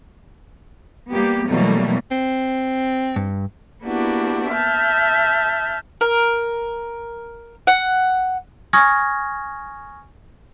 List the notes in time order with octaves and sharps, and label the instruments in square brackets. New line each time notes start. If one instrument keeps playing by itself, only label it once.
[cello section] G3 A#3 B3 G4
B2 E3 F#3 G3 A3 A#3
[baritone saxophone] C4
[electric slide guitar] G2
[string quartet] A#3 B3 D4 E4 F#4 G4
E5 A5 F6 G6
[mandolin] A#4
F#5
[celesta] G#5 C#6 D#6 F6 G#6 A#6